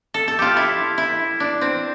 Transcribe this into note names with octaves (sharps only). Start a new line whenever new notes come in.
A4
A4
F4 G4
E4
E4
D4
C4